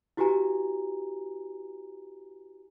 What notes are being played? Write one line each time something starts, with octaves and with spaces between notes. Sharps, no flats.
E4 F#4 G4 B4 G#5 A#5